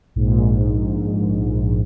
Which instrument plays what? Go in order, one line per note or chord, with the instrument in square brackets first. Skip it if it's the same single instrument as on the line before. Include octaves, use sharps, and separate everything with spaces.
[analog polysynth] A#1 G#2